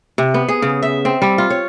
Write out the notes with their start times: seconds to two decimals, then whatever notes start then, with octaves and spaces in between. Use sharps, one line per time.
0.18 C3
0.34 B3
0.48 G#4
0.62 C#3
0.82 E5
1.05 C4
1.22 G3
1.38 F4
1.50 C#5